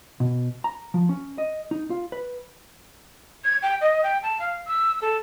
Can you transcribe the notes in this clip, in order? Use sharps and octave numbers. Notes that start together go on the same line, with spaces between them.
B2
A#5
F3
C#4
D#5
D#4
F4
B4
G#6
G5
D#5
G5
A5
F5
E6
A4